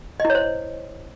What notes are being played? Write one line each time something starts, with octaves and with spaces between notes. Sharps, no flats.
D#5
E4
C#5
C5